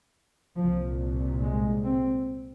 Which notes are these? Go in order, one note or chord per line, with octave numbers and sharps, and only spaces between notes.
C2 A#2 F3
G#3
C4